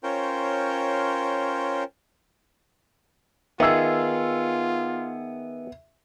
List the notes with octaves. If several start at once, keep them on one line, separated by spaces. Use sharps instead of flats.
C#4 F4 A#4 C5 C#5 G5
D#3 B3 F4 G#4 E5 E6